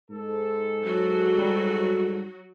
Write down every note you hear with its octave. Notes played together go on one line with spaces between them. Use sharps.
G#2 A4
F#3 F#4
G3